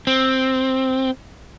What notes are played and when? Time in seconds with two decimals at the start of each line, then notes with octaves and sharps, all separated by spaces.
0.07 C4